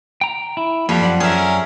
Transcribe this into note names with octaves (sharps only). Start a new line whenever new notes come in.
G5 A#5
E4
F2 G3 A#3 F5
F#2 D5 F#5
C#4 G#4 A#4 E5